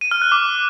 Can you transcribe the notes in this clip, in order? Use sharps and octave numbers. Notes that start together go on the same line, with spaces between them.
D#7
F6
F#6
D6